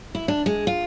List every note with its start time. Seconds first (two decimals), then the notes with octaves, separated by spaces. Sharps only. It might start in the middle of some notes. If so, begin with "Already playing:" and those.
0.15 E4
0.28 D4
0.46 G#3
0.67 F4